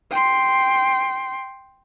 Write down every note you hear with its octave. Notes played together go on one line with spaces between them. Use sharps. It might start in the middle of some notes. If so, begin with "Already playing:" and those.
G5 C6